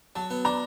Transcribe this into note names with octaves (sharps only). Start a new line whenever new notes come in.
F#3 A5
B3
D4 A#5